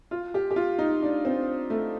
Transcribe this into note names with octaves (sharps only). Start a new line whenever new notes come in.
F4
G4
G4
F4
D#4
D4
C4
A3